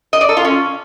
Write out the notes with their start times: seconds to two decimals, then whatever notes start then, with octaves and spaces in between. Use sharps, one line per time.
0.13 D#5
0.21 D5
0.29 A4
0.37 F4
0.45 C#4